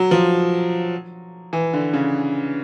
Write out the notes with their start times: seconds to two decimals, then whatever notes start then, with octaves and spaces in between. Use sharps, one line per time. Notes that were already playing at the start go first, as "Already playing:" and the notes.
Already playing: F#3
0.11 F3
1.53 E3
1.73 D3
1.94 C#3